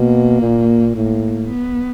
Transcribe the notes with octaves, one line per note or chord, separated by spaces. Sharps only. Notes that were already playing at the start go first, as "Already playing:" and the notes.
Already playing: B2 A#3
A#2
A2 A#3
B3